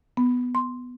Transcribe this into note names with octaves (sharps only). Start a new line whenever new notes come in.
B3
C6